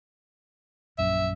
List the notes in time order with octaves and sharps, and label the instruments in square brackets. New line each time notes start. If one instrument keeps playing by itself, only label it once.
[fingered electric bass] A#1 F#2 [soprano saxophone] E5